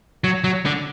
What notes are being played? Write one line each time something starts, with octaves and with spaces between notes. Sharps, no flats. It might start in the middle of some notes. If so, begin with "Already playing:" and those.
F#3
F#3
D3